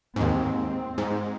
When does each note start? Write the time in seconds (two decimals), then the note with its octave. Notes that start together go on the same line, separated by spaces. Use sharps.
0.16 D#2 G#2 C4
0.98 G#2